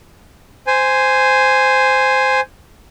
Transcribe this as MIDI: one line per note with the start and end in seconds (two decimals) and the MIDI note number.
0.67 2.40 72
0.67 2.40 80